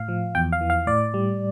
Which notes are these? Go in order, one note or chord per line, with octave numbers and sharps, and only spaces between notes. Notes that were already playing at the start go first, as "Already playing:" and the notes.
Already playing: A2 F5
F3
E2 G5
F5
E3
F5
A2 D5
G3